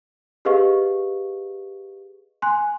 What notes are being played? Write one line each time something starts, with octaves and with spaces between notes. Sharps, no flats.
G4 G#4 B4 D#5 F5 C#6
G#5 C6 F#6